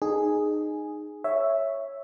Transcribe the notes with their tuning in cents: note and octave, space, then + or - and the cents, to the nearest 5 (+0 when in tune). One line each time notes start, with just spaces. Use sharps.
D#4 -20 G#4 +0
C#5 +0 E5 +0